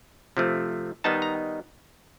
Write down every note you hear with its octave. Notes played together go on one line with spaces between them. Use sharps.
C3 F3 A3
D#3 G3 B3 D#4 A5
A#5